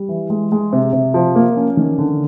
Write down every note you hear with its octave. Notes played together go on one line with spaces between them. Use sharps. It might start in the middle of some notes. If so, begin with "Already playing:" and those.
Already playing: G3
E3
G#3
G#3
C3
C3
F3
A#3
C#4
D#3
D3